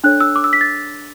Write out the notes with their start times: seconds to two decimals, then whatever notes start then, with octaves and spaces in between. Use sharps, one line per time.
0.04 D4 A4 C#5 F#6
0.20 E6
0.36 D6
0.44 E6
0.53 B6
0.61 A6